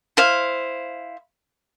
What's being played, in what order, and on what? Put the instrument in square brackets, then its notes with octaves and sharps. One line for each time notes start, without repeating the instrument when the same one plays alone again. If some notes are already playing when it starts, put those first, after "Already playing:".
[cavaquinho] E4 C5 F5